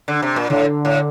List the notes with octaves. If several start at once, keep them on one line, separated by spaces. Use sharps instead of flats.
D3
C3
A#2
A2 D3
A2